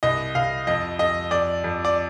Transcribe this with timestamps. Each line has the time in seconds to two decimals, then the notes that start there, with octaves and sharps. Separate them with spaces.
0.03 C2 D#5
0.35 C2 F5
0.67 F2 D#5
0.99 F2 D#5
1.31 F2 D5
1.64 F2
1.85 D5